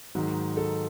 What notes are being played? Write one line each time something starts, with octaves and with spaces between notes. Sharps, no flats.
G#2 D#3 F#3
A4